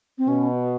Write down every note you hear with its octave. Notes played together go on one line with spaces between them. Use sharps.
C4
B2 C#4